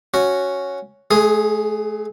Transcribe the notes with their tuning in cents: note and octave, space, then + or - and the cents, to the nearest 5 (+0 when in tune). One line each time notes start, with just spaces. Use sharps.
C#4 +0 F#4 +0
A3 -40 G#4 +0